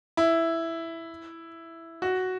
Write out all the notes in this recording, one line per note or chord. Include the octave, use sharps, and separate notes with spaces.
E4
F#4